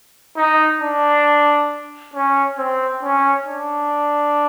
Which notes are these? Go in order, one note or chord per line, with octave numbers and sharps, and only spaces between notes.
D#4
D4
C#4
C4
C#4
D4